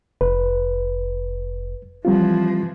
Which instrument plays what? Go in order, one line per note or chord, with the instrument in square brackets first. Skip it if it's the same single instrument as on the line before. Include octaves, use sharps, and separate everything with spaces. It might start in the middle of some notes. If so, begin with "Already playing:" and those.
[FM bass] F1 [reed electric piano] B4
[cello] E3 F3 [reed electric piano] G3 C4 F4